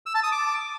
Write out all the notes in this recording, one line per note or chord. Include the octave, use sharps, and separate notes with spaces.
E6
A5
D#6
D6